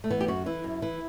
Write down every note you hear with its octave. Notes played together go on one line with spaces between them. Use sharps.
A3
E3 B3
G4
F#2 F#4
E3 E4
F#2
E3 E4